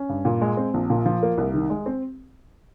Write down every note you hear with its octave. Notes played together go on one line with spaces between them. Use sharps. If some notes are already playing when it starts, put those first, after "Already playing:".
Already playing: C#4
G2
A#2
G#3
C4
A#1
A#2
F3
A#3
C2
D#3
G#3
C4